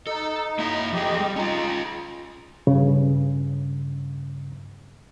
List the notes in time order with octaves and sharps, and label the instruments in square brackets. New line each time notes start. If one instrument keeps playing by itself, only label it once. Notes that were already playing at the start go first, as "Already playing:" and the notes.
[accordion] D#4 [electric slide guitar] A4
[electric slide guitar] A#3 E4 E5
[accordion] F2 G4 D#5 [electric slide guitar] F3 G#4
[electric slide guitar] G3
[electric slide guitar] C#4 F4 [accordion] D#4
[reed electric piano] G2 C#3